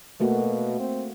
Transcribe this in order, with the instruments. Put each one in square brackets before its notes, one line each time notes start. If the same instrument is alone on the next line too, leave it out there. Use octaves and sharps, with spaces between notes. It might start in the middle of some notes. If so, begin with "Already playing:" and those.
[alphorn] B2 [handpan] A3 A#3 F#4
[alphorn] C4